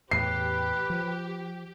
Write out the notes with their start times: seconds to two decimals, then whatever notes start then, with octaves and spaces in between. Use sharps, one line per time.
0.11 E2 A2 G4 B4 C7
0.90 F3